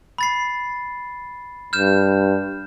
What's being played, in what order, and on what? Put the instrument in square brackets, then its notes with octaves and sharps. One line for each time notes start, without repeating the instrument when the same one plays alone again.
[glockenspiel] B5 A6 C7
[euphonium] G2 [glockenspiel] F6 G6 E7